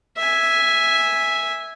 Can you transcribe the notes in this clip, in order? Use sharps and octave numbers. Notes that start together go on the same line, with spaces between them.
E5 G#5